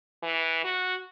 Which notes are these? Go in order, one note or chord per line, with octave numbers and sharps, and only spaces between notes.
E3
F#4